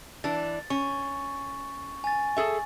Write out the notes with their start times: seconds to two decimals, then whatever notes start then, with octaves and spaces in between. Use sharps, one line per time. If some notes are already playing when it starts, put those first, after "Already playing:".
0.24 E3 D4 A6
0.70 C#4 C#6
2.04 G#5 A6
2.37 G#4 A4 E5